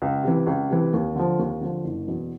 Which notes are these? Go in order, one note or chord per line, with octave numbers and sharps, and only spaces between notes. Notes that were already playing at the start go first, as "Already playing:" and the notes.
C#2
C3 E3
C#2
C3 E3
D#2
D3 F3
D#2
D3 F3
F#1
E2 B2